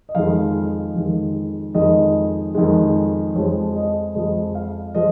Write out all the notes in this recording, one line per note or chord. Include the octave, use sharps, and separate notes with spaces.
D#5
F2 D#3 G#3 F5
F2 D#3 G#3
F2 D#3 G#3 D#5
F2 D#3 G#3
F2 F3 G#3 C#5
D#5
F2 F3 G#3 D#5
F5
F3 G#3 D#5